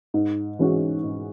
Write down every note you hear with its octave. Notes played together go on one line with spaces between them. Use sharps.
G#2
E3 G#3 C#4 F#4
G#2